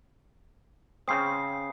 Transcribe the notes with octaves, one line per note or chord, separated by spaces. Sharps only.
C#3 C4 D#6 C7